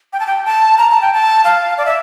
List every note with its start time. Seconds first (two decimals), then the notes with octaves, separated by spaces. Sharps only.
0.13 G5
0.20 A5
0.27 G5
0.45 A5
0.78 A#5
0.90 A5
1.02 G5
1.14 A5
1.44 F5
1.78 D5
1.86 E5